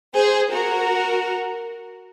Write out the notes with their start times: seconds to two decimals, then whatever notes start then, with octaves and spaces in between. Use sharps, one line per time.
0.14 G#4 C5
0.52 F#4 A#4